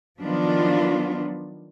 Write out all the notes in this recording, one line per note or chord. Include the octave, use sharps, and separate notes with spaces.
D#3 F3 F#3 B3 D4 F4